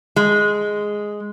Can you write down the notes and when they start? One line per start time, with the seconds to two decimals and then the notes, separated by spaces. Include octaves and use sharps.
0.16 G#3